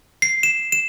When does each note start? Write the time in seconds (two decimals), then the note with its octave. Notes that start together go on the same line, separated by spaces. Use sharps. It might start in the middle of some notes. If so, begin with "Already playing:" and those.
0.22 C7
0.43 E7
0.72 E7